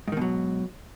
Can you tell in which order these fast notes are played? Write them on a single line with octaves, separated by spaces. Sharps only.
G#2 D#3 B2 F#3